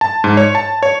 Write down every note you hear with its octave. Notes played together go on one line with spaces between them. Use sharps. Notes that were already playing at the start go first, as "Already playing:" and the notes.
A5
G#2
C#5
A5
C#5